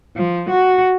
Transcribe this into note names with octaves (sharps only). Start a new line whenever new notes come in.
F3
F#4